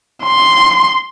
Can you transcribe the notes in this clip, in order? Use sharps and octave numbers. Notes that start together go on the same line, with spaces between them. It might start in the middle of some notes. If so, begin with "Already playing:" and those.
C6